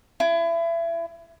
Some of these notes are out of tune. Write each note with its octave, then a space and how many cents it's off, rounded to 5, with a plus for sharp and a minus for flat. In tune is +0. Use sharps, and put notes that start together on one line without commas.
E4 +30